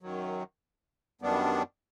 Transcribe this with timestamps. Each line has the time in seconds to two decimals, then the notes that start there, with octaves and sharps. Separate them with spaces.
0.02 F#2 D#3 F#3
1.21 F#2 D#3 G3 B3 D4